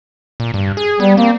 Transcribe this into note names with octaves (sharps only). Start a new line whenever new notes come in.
A#2
G2
G#4
G3 B3
A#3 C4